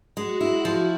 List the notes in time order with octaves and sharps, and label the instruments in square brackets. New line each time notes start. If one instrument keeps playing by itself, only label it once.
[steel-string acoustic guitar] G#3 [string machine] F#4
[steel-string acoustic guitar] E4
F3